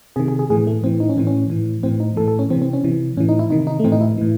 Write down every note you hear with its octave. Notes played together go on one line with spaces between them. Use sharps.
C3 D#3 G#4
G#4
G#4
A2 E3 G#4
A3
A2 E3 C4
D#4
C#4
A2 E3 C4
C#4
A2 E3
A2 E3 C4
D#4
A2 E3 A4
A4
C#4
C3 E3 C4
C4
C#4
C3 E3
A2 E3 C#4
D#4
E4
C3 D#3 D#4
D#4
A3
A2 E3 C4
D#4
E4
A2 E3